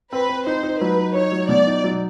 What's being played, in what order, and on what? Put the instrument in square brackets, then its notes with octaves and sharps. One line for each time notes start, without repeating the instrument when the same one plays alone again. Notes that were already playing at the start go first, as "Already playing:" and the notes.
[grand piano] C4 [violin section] B4
[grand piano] C4
[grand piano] D#4 [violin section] C5
[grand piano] D#4
[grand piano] F#3 [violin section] B4
[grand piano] D#4
[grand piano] D#4 [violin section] C#5
[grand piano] F#3
[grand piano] B2 [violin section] D5
[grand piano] D#4
F#3